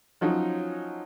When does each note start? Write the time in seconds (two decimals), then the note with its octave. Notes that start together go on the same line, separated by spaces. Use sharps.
0.21 F3 F#3 C#4 D#4